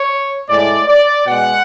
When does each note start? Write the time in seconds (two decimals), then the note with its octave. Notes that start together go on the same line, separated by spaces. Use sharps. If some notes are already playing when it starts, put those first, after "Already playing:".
Already playing: C#5
0.48 A2 G#3 D5
0.88 D5
1.27 B2 G#3 F#5